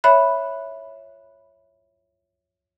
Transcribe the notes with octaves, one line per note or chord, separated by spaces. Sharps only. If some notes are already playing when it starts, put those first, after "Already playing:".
C#5 E5 B5 F#6